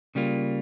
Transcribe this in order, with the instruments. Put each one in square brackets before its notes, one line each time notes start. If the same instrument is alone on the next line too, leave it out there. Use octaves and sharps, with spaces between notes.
[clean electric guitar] C#3 G3 A#3 F4